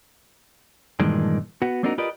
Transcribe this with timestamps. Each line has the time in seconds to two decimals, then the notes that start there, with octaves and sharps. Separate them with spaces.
1.00 G2 A#2 D#3 E3 G#3 D4
1.62 B3 F#4
1.83 A#3 C4 D4 D#4 F#4 A#4
1.98 F4 G4 A#4 B4 D5 D#5